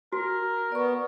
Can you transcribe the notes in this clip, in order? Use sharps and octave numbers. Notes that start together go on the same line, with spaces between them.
F#4 A#4
B3 D5 C#6